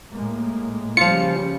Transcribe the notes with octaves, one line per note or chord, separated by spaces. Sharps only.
A2 G#3 A#3
C#3 F3 G3 F4 C#7